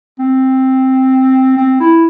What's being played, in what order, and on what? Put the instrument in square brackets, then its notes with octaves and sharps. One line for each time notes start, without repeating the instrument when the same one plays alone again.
[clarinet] C4
C4
E4